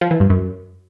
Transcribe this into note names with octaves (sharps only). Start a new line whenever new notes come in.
F3
E3
G2
F#2